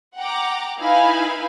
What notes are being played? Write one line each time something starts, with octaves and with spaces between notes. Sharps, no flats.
F#5 G5 A#5 D6
D#4 E4 B4 F5 G#5 B5